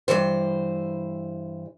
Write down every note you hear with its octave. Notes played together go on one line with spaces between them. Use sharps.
G2 D#3 E3 C5